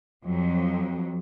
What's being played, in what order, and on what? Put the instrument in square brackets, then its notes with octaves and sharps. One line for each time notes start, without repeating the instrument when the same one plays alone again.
[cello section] F2 F#3